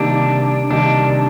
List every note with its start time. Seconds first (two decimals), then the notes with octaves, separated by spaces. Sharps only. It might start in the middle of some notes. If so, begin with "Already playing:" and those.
Already playing: C3 D#3 G3 A#3 D4 D#4
0.71 C3 D#3 G3 A#3 D4 D#4